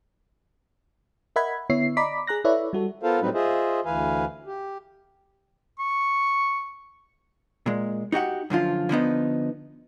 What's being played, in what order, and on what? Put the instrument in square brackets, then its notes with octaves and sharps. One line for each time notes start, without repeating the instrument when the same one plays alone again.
[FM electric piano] A#4 D#5 E5 F#5 B5 G#6
D3 B3 E4 C#5 E5 C7
D5 D#5 A#5 B5 D6 B6
G#4 A#5 F#6 A#6
E4 A4 B4 C#5 D5 E5
G3 F#4 A4
[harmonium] B3 F4 A4 A#4 C5 F5
A2 F#3 G3 C4 D#4 B4
F4 G#4 C5 D#5 E5
D2 E3 B4 F5 G#5
G4
[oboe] C#6
[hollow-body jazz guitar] A#2 G#3
D#4 F#4 G4 F#5
F#2 D3 F3 F4
D3 F3 B3 D#4